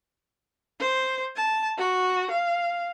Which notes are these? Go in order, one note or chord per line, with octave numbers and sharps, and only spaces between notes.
C5
A5
F#4
F5